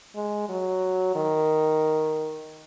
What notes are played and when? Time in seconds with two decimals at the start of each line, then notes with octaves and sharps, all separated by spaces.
0.15 G#3
0.49 F#3
1.15 D#3